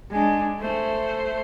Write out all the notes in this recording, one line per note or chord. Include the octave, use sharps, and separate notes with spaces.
G#3 D4
A3 C5